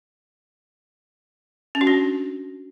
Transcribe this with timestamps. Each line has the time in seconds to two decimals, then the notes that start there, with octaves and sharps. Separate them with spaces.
1.75 C#4
1.81 F#4
1.87 D4